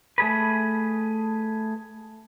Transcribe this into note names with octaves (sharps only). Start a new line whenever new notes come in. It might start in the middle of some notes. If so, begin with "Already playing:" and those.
A3 G#4 B4